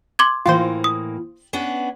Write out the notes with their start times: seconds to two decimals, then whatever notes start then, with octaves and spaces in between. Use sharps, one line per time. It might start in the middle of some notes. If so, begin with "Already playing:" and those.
0.19 C6 D6 G#6
0.46 A2 E3 A#3 F4 C5
0.84 D#6
1.53 B3 C#4 D4